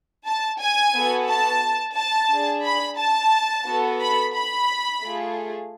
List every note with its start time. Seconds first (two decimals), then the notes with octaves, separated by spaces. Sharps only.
0.27 A5
0.60 G#5
0.95 B3 F#4 A4
1.30 A5
1.97 A5
2.31 D4 G#4
2.65 B5
2.98 A5
3.67 B3 F#4 A4
4.01 B5
4.35 B5
5.02 A3 F4 G#4